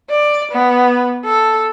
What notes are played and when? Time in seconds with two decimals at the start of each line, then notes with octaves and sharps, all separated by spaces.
0.10 D5
0.52 B3
1.24 A4